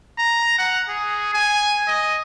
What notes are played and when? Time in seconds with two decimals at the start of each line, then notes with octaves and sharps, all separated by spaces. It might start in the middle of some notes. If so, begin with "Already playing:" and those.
0.19 A#5
0.58 F#5
0.89 G#4
1.34 G#5
1.88 D#5